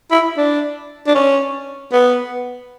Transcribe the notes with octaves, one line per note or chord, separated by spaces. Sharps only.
E4
D4
D4
C#4
B3